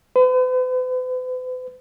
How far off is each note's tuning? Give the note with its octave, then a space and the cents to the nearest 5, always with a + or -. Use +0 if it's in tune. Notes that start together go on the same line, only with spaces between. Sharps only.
B4 +45